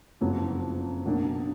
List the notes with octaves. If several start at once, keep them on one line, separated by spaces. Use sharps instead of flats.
F#1 F2 C#3 F#3 B3
B1 B2 F#3 A#3 D4